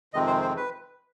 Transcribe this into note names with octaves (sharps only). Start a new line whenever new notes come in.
F2 C3 D#3 G#3 C4 D#5
C5
C5
B4